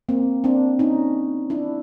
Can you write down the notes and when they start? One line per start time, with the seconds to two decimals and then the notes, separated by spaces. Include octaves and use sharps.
0.09 A#3 C4
0.44 C4 D4
0.79 C#4 D#4
1.50 D4 E4